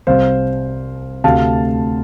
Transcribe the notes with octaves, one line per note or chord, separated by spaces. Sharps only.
C2 C3 C5 F5
D2 C3 F5 A5